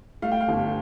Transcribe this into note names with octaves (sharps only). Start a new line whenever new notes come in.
A3 F5
G5
F5
G1